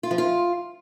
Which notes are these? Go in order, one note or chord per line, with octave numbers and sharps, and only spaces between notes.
F4
F3
F4